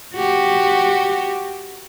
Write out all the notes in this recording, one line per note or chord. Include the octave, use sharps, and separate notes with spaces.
F#4 G4